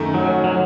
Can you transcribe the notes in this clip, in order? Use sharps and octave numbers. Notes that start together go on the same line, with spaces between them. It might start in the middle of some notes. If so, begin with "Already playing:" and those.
Already playing: F#2 D#3 A3
F#3
F#3